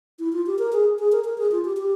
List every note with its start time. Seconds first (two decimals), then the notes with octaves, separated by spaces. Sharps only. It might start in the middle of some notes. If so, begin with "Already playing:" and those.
0.19 E4
0.33 F4
0.46 G4
0.59 A#4
0.72 G#4
0.99 G#4
1.12 A#4
1.24 A#4
1.38 G#4
1.51 F4
1.64 G4
1.77 G4